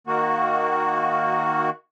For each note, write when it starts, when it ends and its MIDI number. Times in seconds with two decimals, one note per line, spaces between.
0.07 1.70 51
0.07 1.70 58
0.07 1.70 66